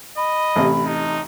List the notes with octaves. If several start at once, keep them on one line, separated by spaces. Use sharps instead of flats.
D#5 B5
A1 C3
D#4